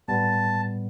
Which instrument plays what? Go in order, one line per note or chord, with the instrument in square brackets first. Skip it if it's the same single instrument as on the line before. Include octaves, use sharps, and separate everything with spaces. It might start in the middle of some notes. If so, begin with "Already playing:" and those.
[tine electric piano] A2 G3 B3 [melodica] A5